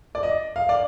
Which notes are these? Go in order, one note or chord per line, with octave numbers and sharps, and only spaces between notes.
D5
D#5
F5
D5